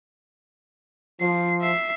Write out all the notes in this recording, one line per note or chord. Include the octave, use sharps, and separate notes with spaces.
F3 C7
E5 C7